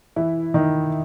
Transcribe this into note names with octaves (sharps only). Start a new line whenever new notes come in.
E3 E4
D#3 D#4